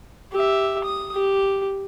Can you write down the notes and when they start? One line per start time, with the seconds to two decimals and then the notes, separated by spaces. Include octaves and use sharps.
0.32 G4 E5
0.84 D#6
1.14 G4